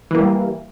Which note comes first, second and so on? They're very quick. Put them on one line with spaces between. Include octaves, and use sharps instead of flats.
E3 A#3 G3